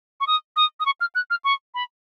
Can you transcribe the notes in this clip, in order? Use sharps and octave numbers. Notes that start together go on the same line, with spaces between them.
C#6
D#6
D#6
D#6
C#6
F6
F#6
F6
C#6
B5